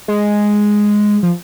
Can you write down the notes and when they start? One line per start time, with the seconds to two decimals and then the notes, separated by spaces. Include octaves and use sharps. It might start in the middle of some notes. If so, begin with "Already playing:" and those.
0.08 G#3
1.23 F3